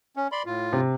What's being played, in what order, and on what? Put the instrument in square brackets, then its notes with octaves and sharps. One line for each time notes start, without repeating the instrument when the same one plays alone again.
[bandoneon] C#4
D5 B5 C6
A2 F4
[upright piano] C3